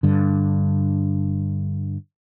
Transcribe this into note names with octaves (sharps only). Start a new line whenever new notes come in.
G2 D3